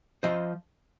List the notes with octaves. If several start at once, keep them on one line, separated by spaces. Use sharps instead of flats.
F3 C5 D#5